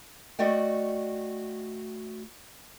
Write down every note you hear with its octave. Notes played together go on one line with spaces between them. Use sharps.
A3 F#4 D5 D#5 G5